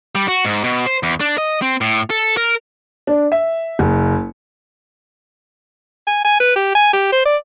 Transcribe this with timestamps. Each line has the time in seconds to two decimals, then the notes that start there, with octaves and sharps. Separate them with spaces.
0.15 G3
0.28 F#4
0.45 G#2
0.64 B2
0.86 C5
1.03 E2
1.20 D4
1.38 D#5
1.62 C4
1.81 A2
2.10 A4
2.37 A#4
3.07 D4
3.32 E5
3.79 F#1
6.07 G#5
6.25 G#5
6.40 B4
6.56 G4
6.75 G#5
6.93 G4
7.12 C5
7.26 D5